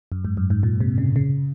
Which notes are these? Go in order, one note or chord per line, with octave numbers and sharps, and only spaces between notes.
F#2
G#2
F#2
G#2
A#2
C3
C#3
C#3